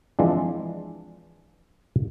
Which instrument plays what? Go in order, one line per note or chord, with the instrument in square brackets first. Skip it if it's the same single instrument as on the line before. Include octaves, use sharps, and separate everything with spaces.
[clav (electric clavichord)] E3 F3 G#3 C4 D4